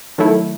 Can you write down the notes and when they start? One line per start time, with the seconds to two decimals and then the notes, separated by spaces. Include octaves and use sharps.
0.18 D#3 F#3 A3 E4